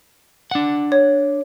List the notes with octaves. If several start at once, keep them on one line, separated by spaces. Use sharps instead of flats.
D4 F#5
C#5